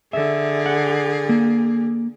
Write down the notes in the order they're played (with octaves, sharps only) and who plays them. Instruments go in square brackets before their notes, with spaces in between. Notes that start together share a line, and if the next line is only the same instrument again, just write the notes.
[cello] D3 G#4 [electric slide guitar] E5
[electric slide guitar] F#5
A#3